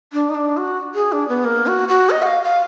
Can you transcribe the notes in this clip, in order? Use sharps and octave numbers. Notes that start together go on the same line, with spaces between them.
D4
D#4
D4
F#4
G#4
D4
B3
A#3
F#4
F#4
D#5
F#5
F5
F5